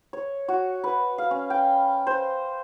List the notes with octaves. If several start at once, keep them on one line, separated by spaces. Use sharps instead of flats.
C#5
F#4
B4
F5
C#4
G5
C5